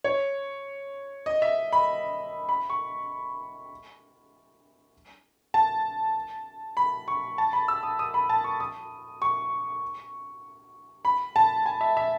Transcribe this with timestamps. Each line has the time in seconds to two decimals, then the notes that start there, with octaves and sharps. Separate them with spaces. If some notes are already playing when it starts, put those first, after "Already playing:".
0.04 C#5
1.26 D#5
1.42 E5
1.72 B5
2.49 B5
2.70 C#6
5.54 A5
6.77 B5
7.08 C#6
7.38 A5
7.53 B5
7.68 E6
7.83 D#6
7.99 D#6
8.14 B5
8.29 A5
8.44 C#6
8.60 D#6
9.22 C#6
11.05 B5
11.36 A5
11.66 G#5
11.81 E5
11.97 E5